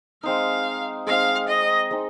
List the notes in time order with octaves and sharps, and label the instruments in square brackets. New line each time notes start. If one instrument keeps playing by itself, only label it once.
[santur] G#3 C4 D#4 [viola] F5
[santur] G#3 C4 D#4 [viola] F5
[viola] D#5
[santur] G#3 C4 D#4